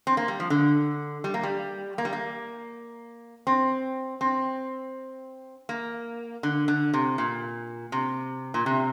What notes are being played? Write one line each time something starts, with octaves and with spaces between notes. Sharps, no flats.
C4
A#3
G3
F3
D3
G3
A#3
G3
A#3
G3
A#3
C4
C4
A#3
D3
D3
C3
A#2
C3
A#2
C3